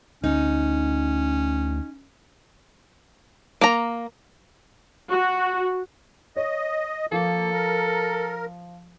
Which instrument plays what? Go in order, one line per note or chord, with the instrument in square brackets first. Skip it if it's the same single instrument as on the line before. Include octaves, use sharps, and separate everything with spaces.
[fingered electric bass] D2 [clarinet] C#4 [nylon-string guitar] D#4
[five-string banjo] A#3 A#5
[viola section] F#4
[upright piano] C#5 [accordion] D#5
[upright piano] F3 [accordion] A#3 [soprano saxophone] A4
[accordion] A#4